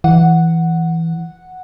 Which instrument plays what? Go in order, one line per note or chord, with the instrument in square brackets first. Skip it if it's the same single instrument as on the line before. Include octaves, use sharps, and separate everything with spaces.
[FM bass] E3 [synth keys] F#5